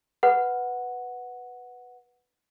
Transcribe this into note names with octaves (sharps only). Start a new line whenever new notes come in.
B4 F#5